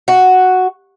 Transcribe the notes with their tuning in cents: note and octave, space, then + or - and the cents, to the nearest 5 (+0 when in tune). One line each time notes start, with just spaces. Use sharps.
F#4 +0